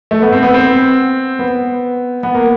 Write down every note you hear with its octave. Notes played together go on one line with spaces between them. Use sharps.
A3
B3
C4
B3
C4
B3
B3
A#3